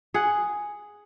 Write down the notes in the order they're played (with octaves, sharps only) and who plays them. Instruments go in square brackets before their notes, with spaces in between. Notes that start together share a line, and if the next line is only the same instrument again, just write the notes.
[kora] G#4 F#5